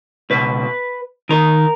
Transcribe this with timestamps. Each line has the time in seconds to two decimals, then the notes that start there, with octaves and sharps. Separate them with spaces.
0.30 C#2 B2 B4
1.29 D#2 D#3 A#4